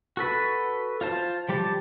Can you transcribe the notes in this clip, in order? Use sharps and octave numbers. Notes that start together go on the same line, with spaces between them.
F#4 A4 B4
F4 C5 A5
F3 G3 G4 A5